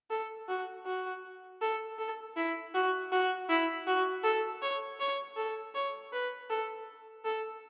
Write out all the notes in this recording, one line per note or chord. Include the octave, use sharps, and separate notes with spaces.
A4
F#4
F#4
A4
A4
E4
F#4
F#4
E4
F#4
A4
C#5
C#5
A4
C#5
B4
A4
A4